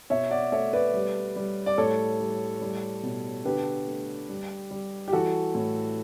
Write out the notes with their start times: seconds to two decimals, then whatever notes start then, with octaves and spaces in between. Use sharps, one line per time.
0.10 B2 C#5 E5
0.31 D5 F#5
0.52 A3 C#5 E5
0.73 B4 D5
0.94 G3
1.36 G3
1.66 D5
1.78 A2 A4 C#5
2.20 G3
2.61 G3
3.03 B2
3.45 D3 G4 B4
3.87 A3
4.29 G3
4.71 G3
5.08 G4
5.13 E3 F#4 A4
5.55 A2